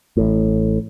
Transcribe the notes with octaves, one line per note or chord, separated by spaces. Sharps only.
A1 A2